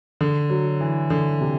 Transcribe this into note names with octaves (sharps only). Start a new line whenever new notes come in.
D3
F#3
E3
D3
C3